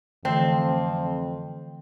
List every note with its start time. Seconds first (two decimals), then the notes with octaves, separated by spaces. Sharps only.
0.25 F2 D3 E3 A3 C4